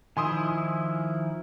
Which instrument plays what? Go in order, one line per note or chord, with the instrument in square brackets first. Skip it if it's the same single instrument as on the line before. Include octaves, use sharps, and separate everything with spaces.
[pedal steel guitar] D#3 F3 E4 [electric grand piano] G#5 C6 D#6